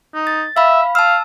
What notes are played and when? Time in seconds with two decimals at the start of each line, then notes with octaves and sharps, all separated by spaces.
0.15 D#4
0.27 A6
0.57 E5 F5 B5
0.95 F5 A5 E6